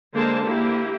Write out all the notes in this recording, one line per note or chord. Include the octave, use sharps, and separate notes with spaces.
D3 G#3 A#3 C5 A5
A#3 E4 G4